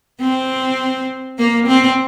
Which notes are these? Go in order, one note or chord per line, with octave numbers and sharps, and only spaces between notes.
C4
A#3
C4